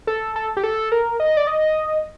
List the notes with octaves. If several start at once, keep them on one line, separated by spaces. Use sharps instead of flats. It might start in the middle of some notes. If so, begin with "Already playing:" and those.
A4
A4
G4
A4
A#4
D#5
D5
D#5